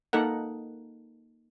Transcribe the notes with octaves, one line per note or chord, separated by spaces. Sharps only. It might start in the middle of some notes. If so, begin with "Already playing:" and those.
A#3 D#4 A4 A#4 F#5